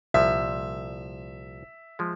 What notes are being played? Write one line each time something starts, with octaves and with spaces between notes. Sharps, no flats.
C2 A#2 F3 E5
F3 G#3